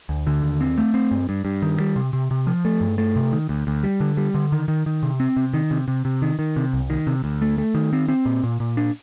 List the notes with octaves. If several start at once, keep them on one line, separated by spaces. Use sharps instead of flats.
D2
D3
D#2
C4
A3
C4
G2
G2
G2
D#3
G3
C3
C3
C3
F3
A3
G2
A3
C3
D#3
D2
D2
G3
D3
G3
D3
D#3
D#3
D#3
C3
C4
C3
D#3
C3
C3
C3
D#3
D#3
C3
C2
D#3
C3
D2
A3
A3
D#3
C4
C4
A#2
A#2
A#2
D4